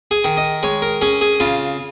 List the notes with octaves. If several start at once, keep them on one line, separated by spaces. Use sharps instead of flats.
G#4
D#3
D#5
G#3 C#5
A#4
C#4 G#4
G#4
C#3 F4